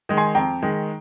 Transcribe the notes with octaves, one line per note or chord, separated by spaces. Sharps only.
D#3 G#3
G#5 C6
F2 G5 A#5
D#3 G#3